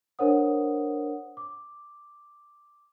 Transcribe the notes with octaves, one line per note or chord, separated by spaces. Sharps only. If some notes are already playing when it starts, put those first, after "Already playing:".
D4 A#4 C5 C#5 F#5 D#6
D6